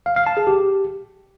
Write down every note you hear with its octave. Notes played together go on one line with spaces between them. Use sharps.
F5
F5
A5
G#4
G4